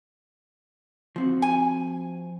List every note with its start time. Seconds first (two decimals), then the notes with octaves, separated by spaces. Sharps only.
1.16 F3 C4 F#4
1.42 G#5